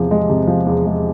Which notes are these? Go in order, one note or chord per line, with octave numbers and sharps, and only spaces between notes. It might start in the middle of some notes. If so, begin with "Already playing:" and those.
Already playing: E2 C3 F3
G#3
C3
F3
E2
G#3